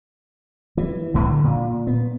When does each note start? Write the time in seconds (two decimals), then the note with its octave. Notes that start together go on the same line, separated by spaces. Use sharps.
0.77 E3
1.14 C2 A2 C3 E3
1.27 D3
1.44 A#2
1.87 B3